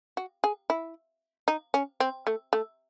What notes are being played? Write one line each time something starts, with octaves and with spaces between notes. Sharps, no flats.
F#4
G#4
E4
D#4
C#4
C4
A3
A3